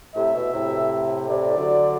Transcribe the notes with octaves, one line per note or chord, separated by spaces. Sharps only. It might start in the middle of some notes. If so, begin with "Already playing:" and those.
A2 C3 E5
B2
A2 C3
A2 C3 D5
D3 F#3